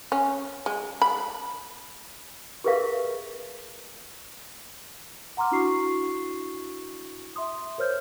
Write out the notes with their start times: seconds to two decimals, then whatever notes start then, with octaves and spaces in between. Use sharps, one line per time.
0.12 C#4
0.66 G#3
1.02 B5
2.64 G4 G#4 A#4 B4 E5 F5
5.37 F#5 A#5 C6 D6 F6
5.51 D4 E4 F#4 C#6 C7
7.36 E5 C6 D#6
7.78 A#4 C5 C#5 F6 G6